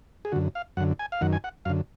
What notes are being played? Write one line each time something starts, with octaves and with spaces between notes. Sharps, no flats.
G#4
F#2 D3 F#4
F5
F#2 D3 F#5
G#5
F5
F#2 D#3 F#5
G#5
F#5
F#2 D3 F5